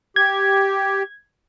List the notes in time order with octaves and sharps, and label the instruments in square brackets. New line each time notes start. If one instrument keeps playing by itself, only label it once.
[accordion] G4 [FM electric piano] G#6